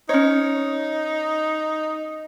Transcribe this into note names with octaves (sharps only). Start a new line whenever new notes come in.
C#4 D#4 C#5